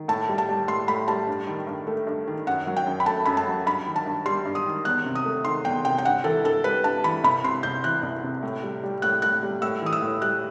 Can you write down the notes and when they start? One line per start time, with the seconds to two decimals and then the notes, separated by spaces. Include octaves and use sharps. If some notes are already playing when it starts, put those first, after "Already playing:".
Already playing: D#3
0.08 A2 A5
0.29 G3
0.38 A5
0.49 G3
0.68 A2 C6
0.88 A2 B5
1.08 G3 A5
1.27 G2
1.47 D#3
1.67 G2
1.87 A3
2.07 G2
2.27 D#3
2.47 F#2 F#5
2.67 F#3
2.77 G5
2.87 F#2
3.00 B5
3.06 A3 A5
3.26 F#2 B5
3.37 A5
3.47 F#3
3.66 G2 B5
3.86 D#3
3.96 A5
4.06 G2
4.26 G3 C6
4.45 G2
4.55 D#6
4.66 D#3
4.85 E2 F#6
5.05 C3
5.15 D#6
5.25 A3
5.45 D#3 C6
5.65 E2 G5
5.84 C3 G5
5.98 G5
6.05 G2 F#5
6.24 E3 A4
6.44 G2 A4
6.64 G3 B4
6.84 G2 A5
7.04 E3 B5
7.24 C2 B5
7.44 C3 C6
7.63 C2 G6
7.84 E3 F#6
8.03 C2
8.23 C3
8.43 A2
8.63 G3
8.84 G3
9.02 A2 F#6
9.22 A2 F#6
9.43 G3
9.62 A2 E6
9.82 E3 D#6
9.93 E6
10.02 A2
10.22 G3 F#6